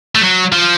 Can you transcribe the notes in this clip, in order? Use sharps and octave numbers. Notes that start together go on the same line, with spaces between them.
A3
F#3
F3